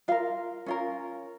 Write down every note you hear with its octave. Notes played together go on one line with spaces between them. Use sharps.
F4 A#4 F5
C#4 F4 A#4